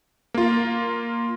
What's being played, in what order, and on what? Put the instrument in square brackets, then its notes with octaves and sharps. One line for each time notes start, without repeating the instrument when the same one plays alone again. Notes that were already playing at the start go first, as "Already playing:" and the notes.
[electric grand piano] A#3 F4